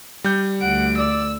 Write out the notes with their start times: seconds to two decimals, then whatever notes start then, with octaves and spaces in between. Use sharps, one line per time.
0.24 G3 G6
0.61 D2 F#5 D7
0.98 D5 E6